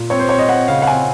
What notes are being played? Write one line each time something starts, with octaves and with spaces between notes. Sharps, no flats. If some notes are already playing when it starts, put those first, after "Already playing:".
Already playing: A#2
C4 C#5
C5
C4 C#5
D#5
C4 F#5
C#3 F5
F#5
C4 G#5